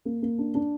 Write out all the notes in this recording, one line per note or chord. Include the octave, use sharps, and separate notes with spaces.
A#3
A#3
D4
D4